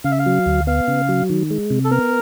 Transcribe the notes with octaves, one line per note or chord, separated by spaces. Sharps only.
C#3 F5
E5
F5
F#3
D2
B3 F5
C#3
F#3
D#3
G#3
C3
A4
B3 A#4